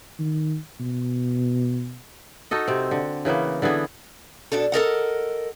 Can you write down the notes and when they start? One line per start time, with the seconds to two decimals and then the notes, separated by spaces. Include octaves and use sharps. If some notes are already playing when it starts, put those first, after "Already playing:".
0.19 D#3
0.80 B2
2.51 D#4 F#4 A4 D#5
2.68 C3 C4
2.91 D3
3.25 C#3 E3 A#3 B3
3.62 D3 E3 B3 G#4
4.52 D2 B2 D4 A4
4.72 A4 A#4 D#5 F#5